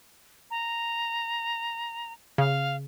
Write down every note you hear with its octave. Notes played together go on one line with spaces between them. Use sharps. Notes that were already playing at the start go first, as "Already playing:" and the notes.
A#5
C#3 F5